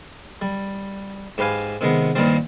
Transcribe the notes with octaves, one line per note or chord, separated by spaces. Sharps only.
G3
G#2 G4 B4 F5 G#5
C3 D#3 G#3 B3
G2 A#2 D#3 F3 G3 C4